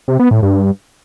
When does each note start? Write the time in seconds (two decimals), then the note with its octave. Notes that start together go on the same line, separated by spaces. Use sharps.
0.08 C3
0.19 B3
0.31 A2
0.42 G2